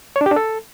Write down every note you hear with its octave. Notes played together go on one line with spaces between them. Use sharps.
C#5
D4
G4
D4
A4